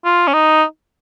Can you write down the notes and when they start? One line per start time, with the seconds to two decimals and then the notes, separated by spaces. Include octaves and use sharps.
0.05 F4
0.28 C#4
0.33 D#4